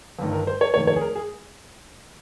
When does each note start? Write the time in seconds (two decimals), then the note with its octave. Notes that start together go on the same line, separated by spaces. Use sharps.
0.19 G1 G2 D#3
0.33 A#4
0.47 C5
0.61 C#5
0.74 F1 D#2 D#3 C#5
0.87 C#5
0.96 G#4
1.01 A#4
1.15 G#4